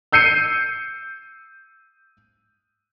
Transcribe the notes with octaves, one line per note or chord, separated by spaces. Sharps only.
E6 G6 C7 C#7 D#7